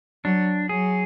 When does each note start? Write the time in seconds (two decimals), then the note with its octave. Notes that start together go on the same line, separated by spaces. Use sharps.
0.25 F#3 D4
0.69 F#3 G#4